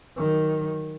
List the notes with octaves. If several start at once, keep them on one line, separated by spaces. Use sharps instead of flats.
D#3 F#3